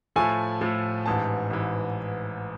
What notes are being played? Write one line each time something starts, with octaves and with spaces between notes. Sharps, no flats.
A2 F3 A3 G#5
A2 F3 A3
A1 G#2 E3 A5
A1 G#2 E3